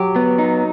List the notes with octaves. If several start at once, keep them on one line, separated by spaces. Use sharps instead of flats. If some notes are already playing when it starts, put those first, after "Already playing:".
Already playing: F#3 G4
B3
D#4